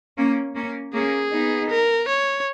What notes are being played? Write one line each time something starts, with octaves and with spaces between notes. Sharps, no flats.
A#3 C#4
A#3 C#4
A#3 C#4 G#4
B3 D#4
A#4
C#5